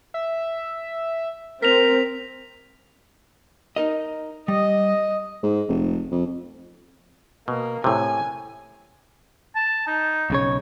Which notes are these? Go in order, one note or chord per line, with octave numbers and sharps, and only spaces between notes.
E5
C4 A#4 B6 F7
D#4 A#4 D#5
G3 D#5
G#2
F1
F2
B2 A#3
A2 C3 G#5
A5
D#4
B1 C#3 C#5